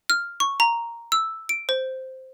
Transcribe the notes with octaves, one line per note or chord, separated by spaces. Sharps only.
F6
C#6
A#5
E6
D7
C5